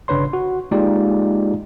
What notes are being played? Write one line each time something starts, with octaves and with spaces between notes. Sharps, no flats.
G1 C#3 D4 B4 C#5 C6
F#4
G#3 A#3 D#4 F4 G4 D5